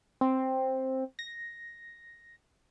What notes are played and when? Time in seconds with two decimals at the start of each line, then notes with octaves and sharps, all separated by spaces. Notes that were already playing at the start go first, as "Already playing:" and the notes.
0.21 C4
1.19 A#6